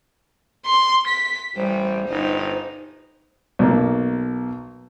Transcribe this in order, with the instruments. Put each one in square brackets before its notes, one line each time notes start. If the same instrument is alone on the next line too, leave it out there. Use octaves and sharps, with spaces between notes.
[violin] C6
B6
[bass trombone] A1 [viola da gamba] G3 [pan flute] C5
[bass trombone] G1 [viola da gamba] D#4
[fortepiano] B1 A#3